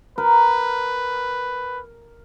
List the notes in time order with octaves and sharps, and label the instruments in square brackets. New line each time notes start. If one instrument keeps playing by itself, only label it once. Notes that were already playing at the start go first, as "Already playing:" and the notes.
[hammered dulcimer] A#4 [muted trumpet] B4